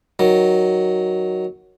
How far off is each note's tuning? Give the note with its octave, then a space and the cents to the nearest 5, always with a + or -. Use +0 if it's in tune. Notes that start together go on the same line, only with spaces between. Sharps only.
D#3 +0 F#3 +0